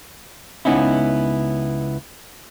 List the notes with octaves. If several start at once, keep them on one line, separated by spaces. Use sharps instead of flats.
C#2 D3 B3 C#4 D#4 E4